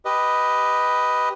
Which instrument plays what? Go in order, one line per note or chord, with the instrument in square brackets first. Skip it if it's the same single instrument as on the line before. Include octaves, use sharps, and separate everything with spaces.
[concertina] G4 B4 D#5